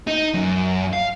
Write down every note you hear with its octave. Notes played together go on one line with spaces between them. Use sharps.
D#4
F#2
F5